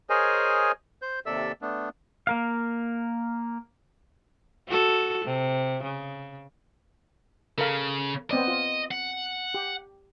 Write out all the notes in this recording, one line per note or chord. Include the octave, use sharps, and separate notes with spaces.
G#4 A#4 C5 C#5 D#5 G#5
C5 G6
D#2 C3 A4 D5 E5 E6
A3 B3 D4
A#3 A#4 F5
F#4 A4
C3
C#3
C#3 A4 A#4 F5
B3 C4 D5 D#5
F4
F#5
G4